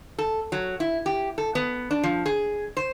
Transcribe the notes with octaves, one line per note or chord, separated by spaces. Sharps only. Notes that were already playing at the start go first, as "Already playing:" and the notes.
A4
F#3
E4
G4
A4
B3
D4
F3
G#4
C5